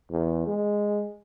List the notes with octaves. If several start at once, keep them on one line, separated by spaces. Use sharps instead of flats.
E2
G#3